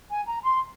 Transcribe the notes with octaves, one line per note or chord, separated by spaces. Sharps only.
G#5
A#5
C6